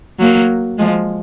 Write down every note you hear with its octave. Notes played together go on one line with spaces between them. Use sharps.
F#3 A#3
F3 G#3